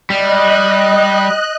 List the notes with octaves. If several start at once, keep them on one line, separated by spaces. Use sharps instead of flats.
G3 D#5 F#6